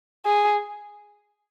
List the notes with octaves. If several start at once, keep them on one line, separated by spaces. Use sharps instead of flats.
G#4